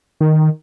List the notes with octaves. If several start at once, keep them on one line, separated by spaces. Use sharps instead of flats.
D#3